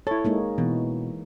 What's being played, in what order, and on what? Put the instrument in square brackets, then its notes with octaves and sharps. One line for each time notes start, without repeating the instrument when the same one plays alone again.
[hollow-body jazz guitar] E4 A4 [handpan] C#5
[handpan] G#3 A#3 D#4
[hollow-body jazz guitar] B2 [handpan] E3